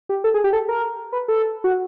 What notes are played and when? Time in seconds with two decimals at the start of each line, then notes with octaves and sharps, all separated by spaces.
0.09 G4
0.24 A4
0.34 G#4
0.44 G4
0.53 A4
0.69 A#4
1.13 B4
1.28 A4
1.64 F#4